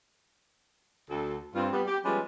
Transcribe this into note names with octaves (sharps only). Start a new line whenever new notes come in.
D2 A4
G2 C4 F4
G3 B3
G4
F3 G3 G#3 B3 C#4 F4